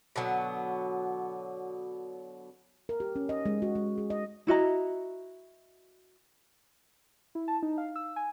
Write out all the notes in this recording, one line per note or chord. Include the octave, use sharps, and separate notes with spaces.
B2 D3 F#3 B3
A#4
G4
C#4
D#5
G#3
F#4
G#3
G#4
D#5
E4 F#4 D#5 A#5
E4
A5
D#4
F5
E6
G#5